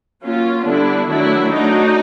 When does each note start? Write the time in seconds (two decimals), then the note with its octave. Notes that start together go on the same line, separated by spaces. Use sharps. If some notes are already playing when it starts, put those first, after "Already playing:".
0.23 F#3 A#3 C#4 F4
0.65 D3 G3 B3 D4 E4
1.08 D#3 F#3 A3 D4 E4
1.50 F#3 A3 D4 D#4